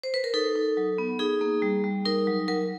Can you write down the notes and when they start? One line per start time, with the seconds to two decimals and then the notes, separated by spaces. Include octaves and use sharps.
0.03 C5
0.14 B4
0.24 A#4
0.34 D#4 A4
0.56 D#4
0.77 F#3
0.98 B3
1.19 D#4 G#4
1.41 A#3
1.62 G3
1.84 G3
2.05 D#4 A#4
2.27 F#3
2.48 F#3 A#4